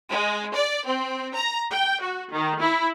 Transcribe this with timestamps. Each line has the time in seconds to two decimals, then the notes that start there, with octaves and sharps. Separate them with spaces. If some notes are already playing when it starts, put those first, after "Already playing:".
0.11 G#3
0.54 D5
0.85 C4
1.35 A#5
1.71 G5
2.01 F#4
2.31 D#3
2.61 E4